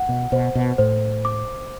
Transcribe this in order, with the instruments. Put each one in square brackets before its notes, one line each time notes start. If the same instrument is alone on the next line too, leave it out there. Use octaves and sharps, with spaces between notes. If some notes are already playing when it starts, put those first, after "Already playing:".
Already playing: [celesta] F#5
[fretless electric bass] B2
[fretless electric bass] B2 [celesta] C5
[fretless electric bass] B2
[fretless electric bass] A2 [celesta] C5
[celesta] D6